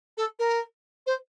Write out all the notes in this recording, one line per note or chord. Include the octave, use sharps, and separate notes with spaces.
A4
A#4
C5